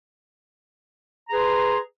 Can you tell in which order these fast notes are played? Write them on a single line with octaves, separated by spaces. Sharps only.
A#5 G#4 B4 C6